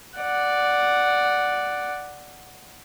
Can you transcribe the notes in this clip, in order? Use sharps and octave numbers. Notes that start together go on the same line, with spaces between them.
D5 F#5